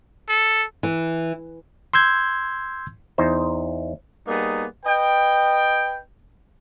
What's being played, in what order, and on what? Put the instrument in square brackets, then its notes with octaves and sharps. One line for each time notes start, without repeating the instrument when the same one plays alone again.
[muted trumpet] A4
[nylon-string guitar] E3
[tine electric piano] C6 E6 G6 G#6
[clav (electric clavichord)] E2 D#4 C5
[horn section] G3 A#3 B3 D#4 G#4
B4 D#5 G5